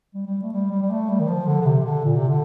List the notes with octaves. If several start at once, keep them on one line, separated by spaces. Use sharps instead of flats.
G3
G3
A3
G3
G3
G3
A3
G3
D#3
F3
D3
D3
C3
C3
D3
A#2
C3
D3